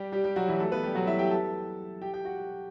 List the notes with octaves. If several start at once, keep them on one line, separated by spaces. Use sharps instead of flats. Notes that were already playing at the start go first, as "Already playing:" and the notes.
Already playing: G3 G4
G3 G4
G3 G4
F#3 F#4
E3 E4
A3 A4
B3 B4
G3 G4
F#3 F#4
E4 E5
G4 G5
A4 A5
G4 G5
G4 G5
F#4 F#5